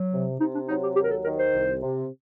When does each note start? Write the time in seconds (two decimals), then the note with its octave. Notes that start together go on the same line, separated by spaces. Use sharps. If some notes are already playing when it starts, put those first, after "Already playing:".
Already playing: F#3
0.11 C3
0.40 C3 D#4
0.54 D4
0.68 F#3 D#4
0.83 G4
0.96 D#2 G4
1.04 A#4
1.10 A4
1.25 D#3 A#4
1.38 C5
1.53 C2
1.82 C3